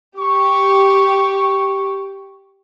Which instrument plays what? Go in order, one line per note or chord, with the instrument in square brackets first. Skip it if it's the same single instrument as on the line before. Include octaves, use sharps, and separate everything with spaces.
[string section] G4 [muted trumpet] C#6